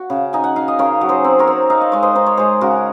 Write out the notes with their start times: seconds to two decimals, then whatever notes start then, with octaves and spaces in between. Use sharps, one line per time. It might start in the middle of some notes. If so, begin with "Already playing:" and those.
Already playing: F#4
0.10 C#3
0.33 D#4 G#5
0.44 F#5
0.56 D#4 F5
0.68 D#5
0.79 C#3 A#4 C#5
1.01 F#3
1.09 G#4 C5
1.24 C4
1.39 A#4 C#5
1.47 C4
1.70 D#4 F5
1.81 D#5
1.92 G#3 C#5
2.02 C5 D#5
2.15 D#4 C5
2.26 C#5
2.37 G#3 G#4 C5
2.61 C#3 F#4 A#4